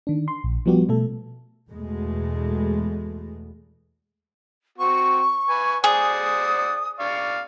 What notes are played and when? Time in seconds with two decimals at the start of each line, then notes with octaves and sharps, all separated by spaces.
0.07 D#3 D4
0.28 C6
0.44 A#1
0.66 F3 G3 B3 F#4 G4
0.89 B2 A3 A4
1.69 E2 B2 G#3 A3
4.78 C4 F#4 C#6
5.50 B4 G#5
5.84 G#4 C5 D5 F#5 D#6
6.99 D5 F5 C#6